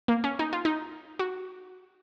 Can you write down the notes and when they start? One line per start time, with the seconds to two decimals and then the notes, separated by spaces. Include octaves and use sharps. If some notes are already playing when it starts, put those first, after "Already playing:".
0.08 A#3
0.24 C#4
0.39 D#4
0.53 F4
0.65 D#4
1.19 F#4